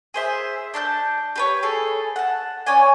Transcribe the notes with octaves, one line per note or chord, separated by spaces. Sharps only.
G#4 C5 E5
D4 A5 F6 G6
G4 B4 C#5
G#4 A4
F#5 A5
C#4 C#5 D5 G#5